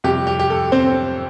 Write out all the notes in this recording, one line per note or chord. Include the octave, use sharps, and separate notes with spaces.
F2 C3 G3 G4
G4
G4
A4
C4 C5